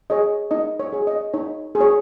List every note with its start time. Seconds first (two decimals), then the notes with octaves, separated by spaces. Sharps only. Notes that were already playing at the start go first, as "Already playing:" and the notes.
0.10 G#4 C#5 D#5
0.51 D#4 D#5
0.80 C#5
0.93 G#4 C#5
1.07 D#5
1.34 D#4 C#5
1.75 G#4
1.81 C#5